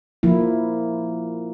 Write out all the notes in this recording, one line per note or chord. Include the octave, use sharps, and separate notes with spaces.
F3 A#3 E4